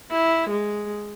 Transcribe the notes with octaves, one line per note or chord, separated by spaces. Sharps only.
E4
G#3